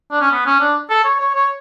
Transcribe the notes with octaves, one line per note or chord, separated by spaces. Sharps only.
D4
C#4
B3
C#4
D4
A4
C#5
C#5
C#5